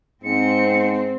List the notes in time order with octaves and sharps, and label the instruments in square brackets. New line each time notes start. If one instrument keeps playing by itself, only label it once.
[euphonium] G#2 [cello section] C4 [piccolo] C#7